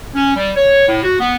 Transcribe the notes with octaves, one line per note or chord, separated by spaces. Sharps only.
C#4
G3
C#5
A2
F#4
B3